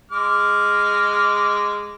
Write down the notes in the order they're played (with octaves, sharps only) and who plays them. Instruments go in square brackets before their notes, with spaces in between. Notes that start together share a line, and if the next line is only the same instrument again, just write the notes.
[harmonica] G#3 D6 F6